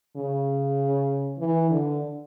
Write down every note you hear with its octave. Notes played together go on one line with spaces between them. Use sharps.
C#3
E3
D3